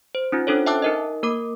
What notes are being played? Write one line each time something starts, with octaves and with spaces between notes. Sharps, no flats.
C5
C#4 D#4 F4
C#4 D4 A4 C5 C#5
E5 G5 A5 D6 E6 F#6
D#4 A#4 D#5
A#3 A#4 D6